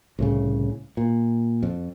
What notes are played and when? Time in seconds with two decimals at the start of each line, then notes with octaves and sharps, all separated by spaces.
0.19 C2 A2 C#3
0.97 A#2
1.63 F2